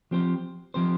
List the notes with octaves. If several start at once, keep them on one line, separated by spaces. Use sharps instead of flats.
F3 C4 G4 C5
F3 C4 G4 C5